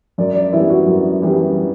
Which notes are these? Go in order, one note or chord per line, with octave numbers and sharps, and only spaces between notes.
F#2 D5
D5
E3 G3 B3 E4
F#4
F#2
E3 G3 B3